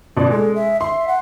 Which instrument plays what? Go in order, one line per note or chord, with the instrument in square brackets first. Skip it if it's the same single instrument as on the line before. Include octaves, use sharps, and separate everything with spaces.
[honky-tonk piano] A1 B2 D5 [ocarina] F4
[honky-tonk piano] G#3 [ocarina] A4
[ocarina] E5
[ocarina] E5 [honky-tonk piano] C6
[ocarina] F#5